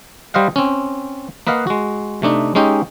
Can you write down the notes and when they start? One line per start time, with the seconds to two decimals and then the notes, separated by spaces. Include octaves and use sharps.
0.34 G3 C5 D#5 F5 F#5
0.56 C4 C#4
1.47 A#3 B4 D#5 F5 F#5
1.67 G#3 F#4
2.22 C3 A3 D4 D#4
2.55 G#3 C#4 D#4 G4